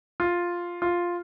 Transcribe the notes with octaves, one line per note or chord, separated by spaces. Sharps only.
F4
F4